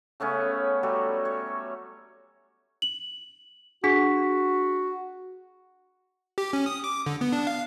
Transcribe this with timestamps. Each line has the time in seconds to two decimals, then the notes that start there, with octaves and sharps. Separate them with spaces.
0.20 C#3 A3 B3 C#4
0.83 F#3 G3 A3 F#4
1.25 C#5
2.82 F#7
3.84 D4 F#4 G#4 B6
6.38 G4
6.53 C#4
6.66 D#6
6.84 D6
7.06 D3
7.21 B3
7.32 D4
7.47 F5